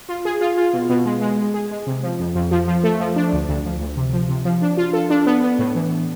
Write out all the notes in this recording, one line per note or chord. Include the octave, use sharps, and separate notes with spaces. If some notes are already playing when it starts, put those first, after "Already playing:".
F4
G#4
F4
F4
B2
B2
G#3
G#3
G#3
G#4
G#3
C3
F3
F2
F2
F3
F3
A3
F3
D4
D2
D2
F3
D2
C3
F3
C3
F3
D4
F4
A4
D4
B3
B3
A2
E3